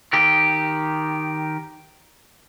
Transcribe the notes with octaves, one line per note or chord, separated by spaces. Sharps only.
D#3 G4